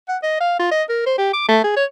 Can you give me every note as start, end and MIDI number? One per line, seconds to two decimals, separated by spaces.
0.08 0.17 78
0.23 0.37 75
0.40 0.59 77
0.59 0.68 65
0.71 0.83 75
0.89 1.04 70
1.06 1.14 72
1.18 1.33 67
1.33 1.44 86
1.48 1.60 57
1.64 1.72 68
1.76 1.84 73